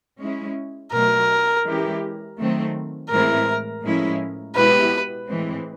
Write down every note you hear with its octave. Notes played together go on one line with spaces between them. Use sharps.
G#3 C#4 E4
B2 F#3 A3 A#4
E3 G#3 C#4 E4 G4
D#3 F#3 A3 C4
A2 E3 G#3 C4 E4 A#4
A2 F3 G#3 C#4 E4
B2 G#3 B3 E4 G4 B4
A2 E3 G#3 C4